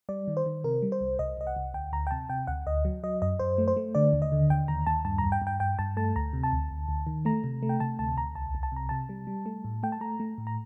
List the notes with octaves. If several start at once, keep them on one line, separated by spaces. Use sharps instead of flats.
G3 D5
D#3
C5
D#3
C3 A#4
G3
C5
C2
C2 D#5
C2 D#5
F#5
C2
D2 G5
D2 A#5
G5
C3 A5
C3 G5
D2 F#5
D2 D#5
F#3
F#3 D#5
F#2 D#5
F#2 C5
A3
C5
A3
D3 D5
D#2
D#5
D3
D#2 G5
D#2 A#5
D#2 A5
G2 A5
A#5
G2
G5
G2
G5
G2 G5
G2 A5
A3 A5
D2 A#5
C3
A5
D2
D2
D2
D#3
A3 A#5
C3
A3
G5
C3 A5
D2 A5
D2 A#5
C2 A5
C2
A5
C3 A#5
C3 A5
G3
G3
A3
A2
A3 G5
A5
A3 A#5
A3
A2
A#5